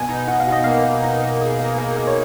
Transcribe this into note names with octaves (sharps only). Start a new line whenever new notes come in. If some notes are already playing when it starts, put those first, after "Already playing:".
Already playing: B2 G#5
D#4
B2 F#5
F5
B2
D#5
A#3 F5
A#3
D#4
A#3
G#4
A#3
A#3
A#3
C#5